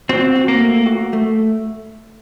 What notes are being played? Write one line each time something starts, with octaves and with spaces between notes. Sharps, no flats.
C4 F#4
F#4
A#3
A3
F#4
A3